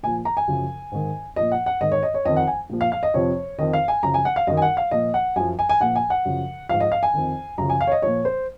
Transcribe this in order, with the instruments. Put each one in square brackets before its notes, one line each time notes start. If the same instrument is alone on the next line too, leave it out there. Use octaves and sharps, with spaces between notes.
[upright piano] A#2 F3 G#5
A#5
G#5
F#2 C#3 F3
G#2 D#3
A#2 F3 D#5
F#5
F#5
G#2 D#3 D#5
C#5
D#5
C#5
F2 D#3 D#5
F#5
G#5
A#2 F3
F5
F5
D#5
F2 C3 F3 C#5
F2 D#3 D#5
F5
G#5
F#2 C#3 F3 A#5
G#5
F#5
F5
F#2 D#3 D#5
G#5
F#5
F5
A#2 F3 D#5
F#5
F#2 F3 G#5
G#5
G#5
A#2 F3 F#5
G#5
F#5
F#2 C#3 F3
G#2 F3 F5
D#5
F5
G#5
F2 D#3
F#2 C#3 F3 A#5
G#5
F5
C#5
D#5
A#2 F3 C#5
C5